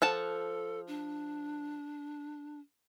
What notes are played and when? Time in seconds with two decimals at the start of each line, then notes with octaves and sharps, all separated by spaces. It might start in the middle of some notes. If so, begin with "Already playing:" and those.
0.02 F3 A4 F#5 A5
0.87 D4